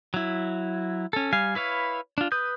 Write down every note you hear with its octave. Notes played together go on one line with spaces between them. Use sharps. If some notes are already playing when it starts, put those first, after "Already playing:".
F#3 E4
C#4 A4
G3 F5 G#5
E4 B4 C#5 F5
D4 F4
B4 D#6 G6